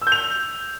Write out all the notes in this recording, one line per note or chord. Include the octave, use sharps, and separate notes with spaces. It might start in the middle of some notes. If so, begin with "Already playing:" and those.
E6
G6
F7